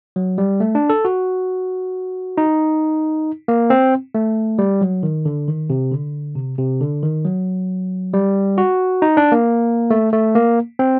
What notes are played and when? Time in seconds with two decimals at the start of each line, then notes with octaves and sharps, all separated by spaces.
0.16 F#3
0.38 G3
0.60 A3
0.75 D4
0.90 A4
1.05 F#4
2.38 D#4
3.48 A#3
3.70 C4
4.15 A3
4.58 G3
4.81 F#3
5.03 D#3
5.25 D3
5.48 D#3
5.70 C3
5.91 D3
6.36 C3
6.58 C3
6.81 D3
7.02 D#3
7.25 F#3
8.14 G3
8.58 F#4
9.02 D#4
9.17 D4
9.32 A#3
9.90 A3
10.13 A3
10.35 A#3
10.79 C4